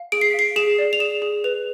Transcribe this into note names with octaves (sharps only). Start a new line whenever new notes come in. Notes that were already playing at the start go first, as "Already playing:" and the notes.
Already playing: F5
G#4 D7
C7
F5 B6
C7
G#4 E7
D5
F7
G#4 E7
G#4
B4 F7